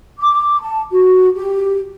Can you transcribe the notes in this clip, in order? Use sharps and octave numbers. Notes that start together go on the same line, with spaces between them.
D6
A5
F#4
G4